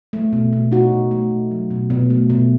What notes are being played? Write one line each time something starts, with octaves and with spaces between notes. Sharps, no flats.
A3
B2
B2
B2 D#4 F#4
B2
A3
B2
F#3
B2
B2
A3
B2